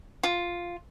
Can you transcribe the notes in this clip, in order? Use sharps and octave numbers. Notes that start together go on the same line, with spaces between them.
F4